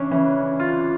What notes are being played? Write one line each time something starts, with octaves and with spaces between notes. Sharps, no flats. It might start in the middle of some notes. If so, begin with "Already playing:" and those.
Already playing: C#3 E3 C#4 D4
C#3 E3 C#4
F4